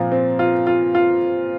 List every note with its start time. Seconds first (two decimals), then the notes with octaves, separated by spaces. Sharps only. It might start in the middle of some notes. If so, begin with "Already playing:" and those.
Already playing: A#2 F3 C4
0.12 C4
0.39 F4
0.67 F4
0.95 F4